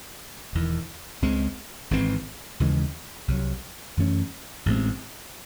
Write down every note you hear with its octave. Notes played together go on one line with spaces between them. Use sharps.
E1 E2 D#3
C#2 C#3 G#3 C4
G#1 G#2 E3 C4
D#2 C#3 E3 G#3
C2 C3 F#3
F#2 E3 A3 C#4
A1 A2 G#3 C4